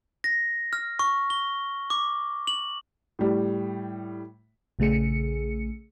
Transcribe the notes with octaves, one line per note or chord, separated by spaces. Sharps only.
A#6
F6
C#6
G7
D6
F#7
A2 G3
A#1 C#3 A3 G#4 C#7